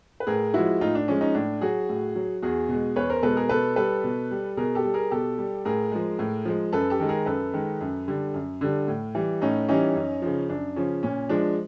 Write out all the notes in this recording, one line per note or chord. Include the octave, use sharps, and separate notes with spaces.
B4
A2 G#4 A#4
F3 G#3 E4 F#4
A2 D#4 F4
D4
F3 G#3 C#4
C#4 D#4
A2 D4
F#3 F#4 G#4
A2
F#3
E2 F#4 G#4
B2 G#3
E2 B4 C#5
A#4 C5
B2 G#3 A4 B4
G#4 A#4
B2 A4 B4
G3 A4 B4
B2
G3
B2 G#4 A#4
G4 A4
G3
G#4 A#4
B2 G4 A4
G3
A2 G#4 A#4
F3 G#3
A2
F3 G#3
F#2 A4 B4
G4 A4
D#3 G#3
G#4 A#4
F#2 A4 B4
D#3 G#3
F#2
D3 G3
F#2
D3 G3
A2
E3 G3
A2 C#4 D#4
E3 G3 C#4 D#4
F#2
C#3 F3
F#2 D4
C#3 F3 C#4
A#2 C#4
F3 G#3 D4